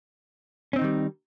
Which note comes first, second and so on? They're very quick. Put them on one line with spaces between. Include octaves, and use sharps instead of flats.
C#4 C4 D#4 D#3 G3